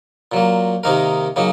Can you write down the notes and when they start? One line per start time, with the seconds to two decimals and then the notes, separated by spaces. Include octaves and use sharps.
0.32 A#2 F#3 A#3
0.83 C3 D#3 A#3 D#4 A#4
1.36 C#3 F#3 A#3 D#4